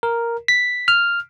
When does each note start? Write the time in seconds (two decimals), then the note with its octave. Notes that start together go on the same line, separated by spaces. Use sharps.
0.03 A#4
0.48 B6
0.88 F6